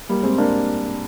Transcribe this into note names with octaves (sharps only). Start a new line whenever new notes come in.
G3 A#3
G#3 C4
A#3 D4